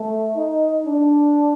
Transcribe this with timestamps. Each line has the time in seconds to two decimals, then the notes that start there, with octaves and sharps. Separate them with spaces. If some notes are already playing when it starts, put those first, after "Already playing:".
Already playing: A3
0.35 D#4
0.86 D4